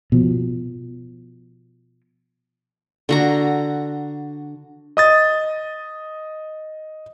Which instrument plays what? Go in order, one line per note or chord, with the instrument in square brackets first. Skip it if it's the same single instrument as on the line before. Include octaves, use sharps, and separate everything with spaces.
[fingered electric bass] B2 F3
[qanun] D3 F#4 A#5
[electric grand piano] D#5 D#6 A6